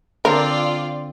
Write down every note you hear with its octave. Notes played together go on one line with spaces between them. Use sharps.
D3 C4 D4 F4 A#4 D5